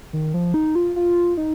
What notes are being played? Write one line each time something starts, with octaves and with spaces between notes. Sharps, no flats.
D#3
F3
D#4
F4
F4
D#4